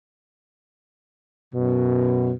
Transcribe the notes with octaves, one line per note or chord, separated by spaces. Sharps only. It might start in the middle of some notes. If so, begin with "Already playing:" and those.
F#2 B2